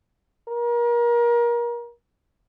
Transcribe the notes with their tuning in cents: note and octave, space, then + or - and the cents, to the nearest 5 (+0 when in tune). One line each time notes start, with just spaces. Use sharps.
A#4 +30